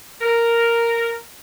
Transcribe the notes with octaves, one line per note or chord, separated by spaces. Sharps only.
A#4